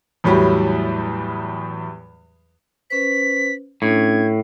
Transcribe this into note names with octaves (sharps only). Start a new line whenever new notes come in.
E2 A2 F#3 G3
C#4 B4 C5 B6
A2 C#4 D4 G#6